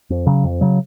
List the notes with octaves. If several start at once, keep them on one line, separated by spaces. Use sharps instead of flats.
F2
C#3 F#3
F2
C#3 F#3